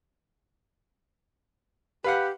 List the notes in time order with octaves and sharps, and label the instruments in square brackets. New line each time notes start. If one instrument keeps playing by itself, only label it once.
[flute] G4 [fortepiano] B4 F5 F#5